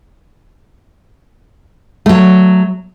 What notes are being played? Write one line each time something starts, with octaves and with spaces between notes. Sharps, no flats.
F#3 A3